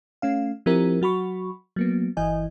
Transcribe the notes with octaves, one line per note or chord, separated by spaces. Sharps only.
A3 C#4 F5
F3 C4 E4 G4 A#4
F#3 F#4 B5 C#6
F#3 A#3 B3
G1 E3 E4 D#5 G#5